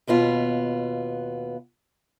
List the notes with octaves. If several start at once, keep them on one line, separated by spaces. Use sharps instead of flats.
D#2 B2 B3 F4